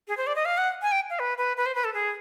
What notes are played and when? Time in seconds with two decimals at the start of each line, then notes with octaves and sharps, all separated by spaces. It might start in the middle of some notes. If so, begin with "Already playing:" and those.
0.08 G#4
0.17 C5
0.27 D5
0.36 D#5
0.45 F5
0.58 F#5
0.82 G#5
0.92 G5
1.10 F5
1.19 B4
1.38 B4
1.57 B4
1.66 C5
1.75 B4
1.84 A4
1.94 G#4